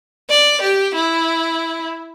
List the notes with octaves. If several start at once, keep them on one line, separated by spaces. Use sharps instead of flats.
D5
G4
E4